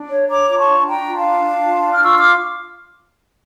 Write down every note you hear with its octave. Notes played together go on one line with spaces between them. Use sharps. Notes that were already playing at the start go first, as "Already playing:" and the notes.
Already playing: D4
C#5
C#5 A#5 D6
F4 D6
A5 C#6
D4
D4 G5 A#5
F4
F5 A5
D4
D4
F4
D4
F6
F4 C#6 E6
D6 F6